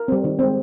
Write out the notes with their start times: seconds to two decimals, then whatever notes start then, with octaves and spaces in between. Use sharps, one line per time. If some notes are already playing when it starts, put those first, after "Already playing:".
Already playing: A#4
0.08 G3 C4
0.24 D#3
0.39 G#3 C4